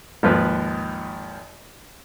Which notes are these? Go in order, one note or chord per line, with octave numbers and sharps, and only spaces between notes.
G#1 D#2 F3 B4